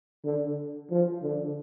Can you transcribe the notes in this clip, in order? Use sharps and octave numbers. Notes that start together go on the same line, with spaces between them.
D3
F3
D3